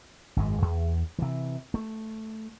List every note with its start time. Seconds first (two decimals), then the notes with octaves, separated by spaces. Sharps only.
0.37 G#1 F#2 G#3
0.62 E2
1.19 C3 E3
1.74 A3